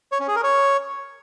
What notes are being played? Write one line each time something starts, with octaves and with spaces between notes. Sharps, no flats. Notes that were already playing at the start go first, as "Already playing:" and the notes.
C#5
C#4
G#4
A#4
C#5